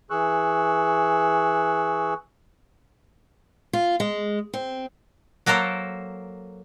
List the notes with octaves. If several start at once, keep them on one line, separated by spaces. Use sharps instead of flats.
E3 G#4 C#6 E6 F#6
F4
G#3
C4
F#3 A#3 A4 A#4 C5